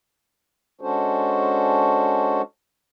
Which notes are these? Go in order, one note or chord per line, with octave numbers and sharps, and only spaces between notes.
G#3 C#4 D4 F#4 A4 C5